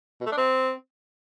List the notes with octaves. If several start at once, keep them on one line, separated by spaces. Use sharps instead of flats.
B2
A3
D4
C4